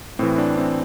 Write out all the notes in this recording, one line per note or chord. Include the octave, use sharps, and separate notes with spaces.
A2 E3 C4
D4
C4